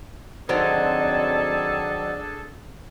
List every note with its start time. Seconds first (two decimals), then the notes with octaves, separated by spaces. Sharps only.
0.49 D#3 F#3 C4 D4 G#4 A4 D5